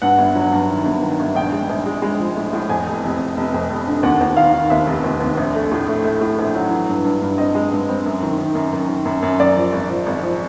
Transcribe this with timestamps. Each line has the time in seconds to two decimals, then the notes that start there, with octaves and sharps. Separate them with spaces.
0.02 G2 F#5
0.18 G1
0.35 F#3
0.52 G2
0.69 D#3
0.85 G1
1.02 D#3
1.19 G1
1.35 A#1 G5
1.52 G#3
1.69 A#1
1.86 G#3
2.02 G#3
2.19 F3
2.37 A2
2.53 A2
2.69 F2 G#5
2.87 F1
3.04 F1
3.19 F1
3.37 F1
3.54 F2
3.70 F1
3.87 D3
4.03 D#2 F#5
4.21 D#2
4.37 D#3 F5
4.54 D#3
4.70 D#2 E5
4.87 F1
5.04 D#2
5.20 D#2
5.37 A#1
5.54 A3
5.72 A2
5.88 A3
6.04 A3 E5
6.21 A2
6.39 A#1
6.55 F#3
6.71 E3
6.89 G2
7.04 G2
7.22 G2
7.38 C4 D#5
7.55 G#3
7.72 G2
7.89 C4
8.06 F#2
8.23 D#3
8.38 D#3
8.55 F#2
8.73 F#2
8.89 D#3
9.05 F#2
9.22 F#2
9.40 F#2 D5
9.57 F3
9.73 G#1
9.89 F3
10.06 G#1
10.23 F3